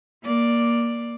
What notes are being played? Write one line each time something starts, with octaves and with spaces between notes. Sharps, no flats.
A#3 D5